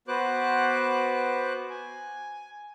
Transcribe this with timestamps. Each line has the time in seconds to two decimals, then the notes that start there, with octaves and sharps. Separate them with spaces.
0.08 B3 F#4 B4 C5 D6 F#6
1.70 G#5